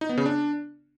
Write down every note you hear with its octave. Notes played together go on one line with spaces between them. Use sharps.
D#4
B3
C#3
D4